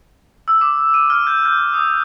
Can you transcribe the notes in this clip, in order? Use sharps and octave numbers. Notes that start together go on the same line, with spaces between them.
E6
D6
D#7
F6
G6
G6
D#6